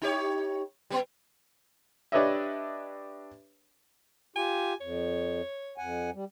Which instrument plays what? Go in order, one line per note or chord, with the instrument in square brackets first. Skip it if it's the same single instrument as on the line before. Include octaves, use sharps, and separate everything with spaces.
[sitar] D#4 G4 C#5
G3 A#3 B3
[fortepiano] D4 G4 B4 C#5 D#5 E5
[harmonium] F4 G4 [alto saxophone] G#5
[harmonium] F2 [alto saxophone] C#5
[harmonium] F2 F#5 G#5
G3